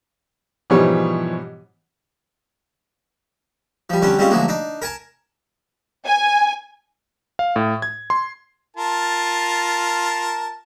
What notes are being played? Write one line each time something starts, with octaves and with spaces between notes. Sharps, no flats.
G#2 B2 E3 F3 G3 C#5
F3 G3
D3 G3 C4 C#4
G3 G#3 C4 C#4 F4
D2 F3 F#3 G#3 A#3
D4 D#4
A#4 G#5 A5
G#5
F5
A2
G#6
C6
F4 A#4 A5